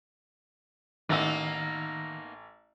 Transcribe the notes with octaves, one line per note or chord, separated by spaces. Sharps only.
A1 D#3 A#3 B3 D#4 E6